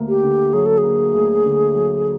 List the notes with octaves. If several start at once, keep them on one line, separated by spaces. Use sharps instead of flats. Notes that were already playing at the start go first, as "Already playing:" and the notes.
Already playing: D2 A#3
G4
D3
F#3 G#4
A4
G#4
A#3
D2
D3
F#3